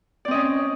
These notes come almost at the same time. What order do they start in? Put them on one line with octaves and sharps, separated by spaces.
D5 C4 D#5 C#4